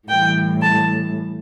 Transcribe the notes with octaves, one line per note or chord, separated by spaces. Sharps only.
A2 E3 G3 G5
A5